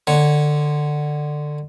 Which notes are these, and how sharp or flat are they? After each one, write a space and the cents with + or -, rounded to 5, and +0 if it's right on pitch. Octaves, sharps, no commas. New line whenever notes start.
D3 +20 C#5 -5